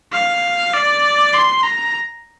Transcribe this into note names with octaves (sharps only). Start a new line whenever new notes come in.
F5
D5
C6
A#5